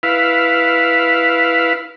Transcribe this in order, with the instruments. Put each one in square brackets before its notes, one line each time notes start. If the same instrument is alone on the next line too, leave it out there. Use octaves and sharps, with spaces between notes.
[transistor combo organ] E4 B4 F5